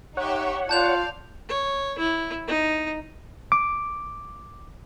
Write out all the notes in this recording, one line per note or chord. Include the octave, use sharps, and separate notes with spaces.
D#4 G4 C#5 E5 F#5
F4 D5 F5 A5 G6 F7
C#5
E4
D#4
D6